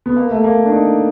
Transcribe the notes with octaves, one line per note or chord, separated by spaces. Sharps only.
B3
A#3
A3
A#3
D4
D#4